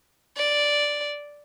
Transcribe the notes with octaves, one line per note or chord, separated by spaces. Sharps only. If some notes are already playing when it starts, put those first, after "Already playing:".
D5